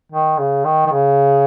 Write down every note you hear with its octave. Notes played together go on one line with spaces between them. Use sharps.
D#3
C#3
D#3
D#3
C#3